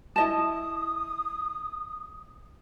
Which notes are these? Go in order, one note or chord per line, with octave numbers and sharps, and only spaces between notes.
E4 D#5 A5 D#6